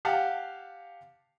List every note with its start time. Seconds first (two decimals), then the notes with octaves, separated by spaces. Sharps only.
0.05 G4 F5 F#5 A5